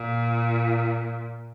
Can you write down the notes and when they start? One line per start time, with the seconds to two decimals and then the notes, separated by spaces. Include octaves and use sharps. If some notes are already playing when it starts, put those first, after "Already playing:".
Already playing: A#2